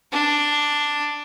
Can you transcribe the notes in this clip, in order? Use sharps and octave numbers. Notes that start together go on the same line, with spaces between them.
D4